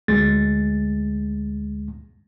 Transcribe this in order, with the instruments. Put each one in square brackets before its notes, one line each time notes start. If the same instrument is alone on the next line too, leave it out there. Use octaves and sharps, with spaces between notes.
[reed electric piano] D2 G#3 A6